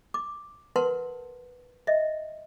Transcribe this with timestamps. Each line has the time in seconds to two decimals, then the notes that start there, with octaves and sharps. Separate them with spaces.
0.14 D6
0.76 A#4 B4 F#5 A5 C6
1.87 D#5 E5